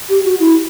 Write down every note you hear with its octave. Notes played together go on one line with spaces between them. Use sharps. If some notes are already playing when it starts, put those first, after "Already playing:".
G4
F#4
E4